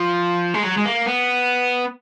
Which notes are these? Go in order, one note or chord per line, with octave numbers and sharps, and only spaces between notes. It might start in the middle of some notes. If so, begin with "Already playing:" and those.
Already playing: F3
G#3
F#3
G#3
A#3
B3